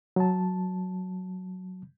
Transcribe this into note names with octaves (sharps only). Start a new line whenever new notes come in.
F#3 A5